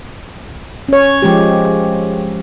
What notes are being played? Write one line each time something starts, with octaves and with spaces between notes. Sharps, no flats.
C#4 C#5
F3 G#3 G4